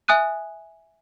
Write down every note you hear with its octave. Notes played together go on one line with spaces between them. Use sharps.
E5 G#5 D#6 F#6 D#7